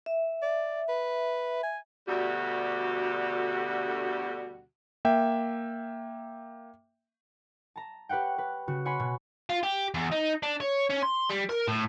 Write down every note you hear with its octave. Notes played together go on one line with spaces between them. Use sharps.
E5
D5
B4
G#5
D2 B2 D3 G3 F#4 G4
A#3 E5 G5
A5 A#5
G4 B4 C#5 F#5 G5
B4
C#3 F#4
C#5 F#5 G#5 B5 C6
B2
F4
G4
E2
D#4
D4
C#5
C#4
C6
G3
A#4
A2